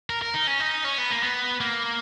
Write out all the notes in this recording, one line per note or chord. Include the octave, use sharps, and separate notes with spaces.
A#4
A#4
D#4
C#4
D#4
C#4
B3
A#3
B3
A#3